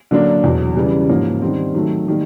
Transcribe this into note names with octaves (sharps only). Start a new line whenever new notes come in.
D3 F#3 A#3 D4
E2 B2 F#3
C#3 E3 G3
G#2 F3 A#3 C#4
D#3 G3 C4
D#3 F#3 A3
D#3 G3 A#3